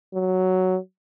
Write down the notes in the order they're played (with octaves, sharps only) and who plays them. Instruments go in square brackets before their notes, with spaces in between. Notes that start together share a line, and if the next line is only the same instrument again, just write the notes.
[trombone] F#3